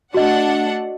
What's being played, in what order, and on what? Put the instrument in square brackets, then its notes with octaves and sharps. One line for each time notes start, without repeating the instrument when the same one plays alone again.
[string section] A3 D4 F#5 [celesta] F#4 D#5